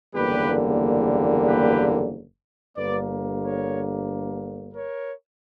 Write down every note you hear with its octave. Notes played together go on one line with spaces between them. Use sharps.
F#1 E2 D3 G3 A#3 G4 B4
G4 B4
G1 G2 D3 A#3 B4 D5
A#4 C#5
A#4 C#5